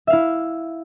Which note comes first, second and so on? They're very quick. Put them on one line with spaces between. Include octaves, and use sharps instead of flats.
E5 F5 E4